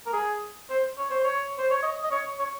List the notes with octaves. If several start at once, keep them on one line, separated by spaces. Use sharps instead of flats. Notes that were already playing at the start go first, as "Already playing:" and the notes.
A#4
G#4
C5
C#5
C5
C#5
C5
C#5
D#5
D#5
C#5
C#5